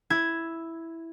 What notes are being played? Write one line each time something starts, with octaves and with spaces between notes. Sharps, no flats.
E4 G#6